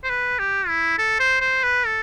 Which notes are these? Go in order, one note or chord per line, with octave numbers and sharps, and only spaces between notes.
C5
B4
G4
E4
A4
C5
C5
B4
A4